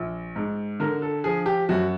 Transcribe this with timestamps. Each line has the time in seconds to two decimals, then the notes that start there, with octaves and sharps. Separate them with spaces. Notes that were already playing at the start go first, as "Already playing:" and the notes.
Already playing: A#1
0.36 G#2
0.80 D3 A#4
1.02 A4
1.24 F3 G#4
1.46 G4
1.69 F#2 F#4